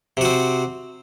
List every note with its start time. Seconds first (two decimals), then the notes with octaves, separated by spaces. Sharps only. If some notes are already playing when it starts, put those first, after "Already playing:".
0.17 C3
0.21 F#4
0.25 C4